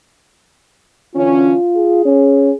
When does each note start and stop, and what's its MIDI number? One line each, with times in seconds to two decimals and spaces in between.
1.15 1.53 50
1.15 1.53 52
1.15 1.53 61
1.15 2.01 65
1.75 2.56 68
2.05 2.51 61